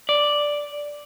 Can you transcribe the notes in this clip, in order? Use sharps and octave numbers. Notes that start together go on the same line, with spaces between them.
D5